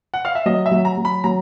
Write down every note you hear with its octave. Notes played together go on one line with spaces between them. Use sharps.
F#5
F5
E5
F#3 D#5
E5
F#3
A#5
F#3
B5
F#3 A#5